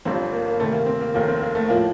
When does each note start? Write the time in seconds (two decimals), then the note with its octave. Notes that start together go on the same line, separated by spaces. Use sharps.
0.05 G1 G2 F3 C4
0.32 A#3
0.46 A#3
0.59 D2 C3 D#3 A3
0.73 A#3
0.86 C4
1.01 A#3
1.14 F1 D#2 D#3 A#3
1.28 C4
1.41 A#3
1.55 A3
1.68 A2 F3 A#3